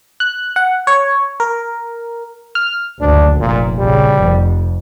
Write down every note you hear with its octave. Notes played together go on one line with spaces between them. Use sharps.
F#6
F#5
C#5
A#4
F6
F#1 D2 D4
F1 A#1 A#2
A#1 C#3 G3
F1 F2